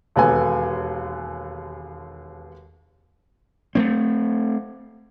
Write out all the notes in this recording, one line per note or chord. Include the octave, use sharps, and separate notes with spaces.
E1 D#2 B3 A4 G#5
A3 A#3 C4